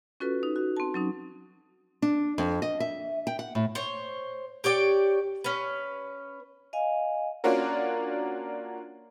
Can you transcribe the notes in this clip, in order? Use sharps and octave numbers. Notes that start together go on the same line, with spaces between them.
C#4 F4 F#4 A4 B4
D#4
F#4
C4 A5
F#3 C#4 D#4
D4
F2
D#5
E5
G5
F#5
A2
C5 C#5
G4 C#5 D5 G5
C#4 B4
D#5 F5 G#5
A#3 C#4 D4 F4 F#4 A#4